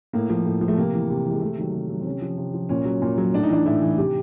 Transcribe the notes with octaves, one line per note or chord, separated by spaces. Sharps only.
A2 A#3
F3
A2
F3
A3
C3 A#3
E3
C3
E3 G#3
C3 A3
D#3 F#3
C3
D#3 F#3
C4
C3 C#4
F3
C3
F3
A#2 C#4
F#3
A#2
F#3
A2 D4
D#4
E3 D4
A2 E4
E3
C3 G4